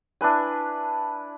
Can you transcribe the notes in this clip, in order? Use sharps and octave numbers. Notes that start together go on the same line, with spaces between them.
D4 E4 B4 G#5